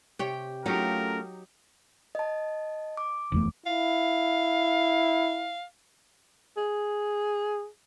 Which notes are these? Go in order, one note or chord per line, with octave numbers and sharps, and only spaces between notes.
C3 G4 C#5 G5
F#3 A3 C#4 D#4 F4 G4 A#4
D#5 A5
D6
F1 E2 A3
E4 F5
G#4